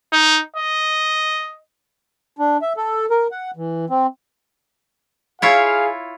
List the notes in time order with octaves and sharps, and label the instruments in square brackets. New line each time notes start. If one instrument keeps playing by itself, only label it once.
[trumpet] D#4
D#5
[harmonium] D4
E5
A4
A#4
F#5
E3
C4
[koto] E4 F4 C#5 [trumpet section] G#4 F5